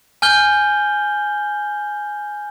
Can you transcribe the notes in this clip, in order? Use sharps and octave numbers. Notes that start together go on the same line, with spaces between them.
G#5 F6 G6 G7